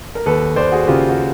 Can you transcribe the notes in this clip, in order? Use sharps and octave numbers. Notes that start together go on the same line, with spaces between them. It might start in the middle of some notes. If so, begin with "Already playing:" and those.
A#4
D#2 A4 B4
D#2 C5 D5
F#4 G#4
C#3 F4 G4
F#4